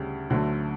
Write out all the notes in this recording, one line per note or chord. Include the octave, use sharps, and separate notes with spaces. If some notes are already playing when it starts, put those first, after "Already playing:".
Already playing: D2 C#3 G3
D2 D3 F#3 A3